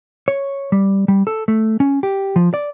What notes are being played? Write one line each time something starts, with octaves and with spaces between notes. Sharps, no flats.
C#5
G3
G3
A4
A3
C#4
G4
F3
D5